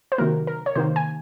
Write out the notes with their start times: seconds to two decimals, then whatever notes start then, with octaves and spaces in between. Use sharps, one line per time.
0.12 C5
0.18 C3 D#3 F#3 A#3 A#4
0.47 A#4
0.66 C#5
0.75 C3 D#3 A#3 C5
0.96 G#5